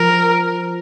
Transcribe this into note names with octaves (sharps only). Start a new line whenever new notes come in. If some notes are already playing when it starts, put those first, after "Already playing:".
Already playing: F3 A#4